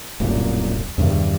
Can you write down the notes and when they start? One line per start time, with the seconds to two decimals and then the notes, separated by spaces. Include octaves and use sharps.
0.20 D1 C2 F#2 A#2
0.98 E2 G2 C3 D#3